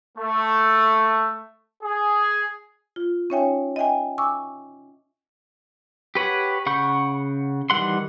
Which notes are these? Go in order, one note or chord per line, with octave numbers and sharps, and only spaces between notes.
A3
G#4
F4
C#4 D#4 C#5 E5 G5 G#5
D#5 E5 G5 G#5
G#5 C#6 D6 E6
G4 B4 C#5 F#5
C#3 F#5 B5 C#6 G6
D#3 E3 G3 F#5 C6